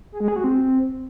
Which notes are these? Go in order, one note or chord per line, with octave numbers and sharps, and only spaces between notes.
G#4
G#3
G#4
F#4
C4